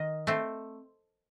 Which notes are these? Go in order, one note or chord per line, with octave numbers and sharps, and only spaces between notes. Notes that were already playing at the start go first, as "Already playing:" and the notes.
Already playing: D#3 D#5
A3 C4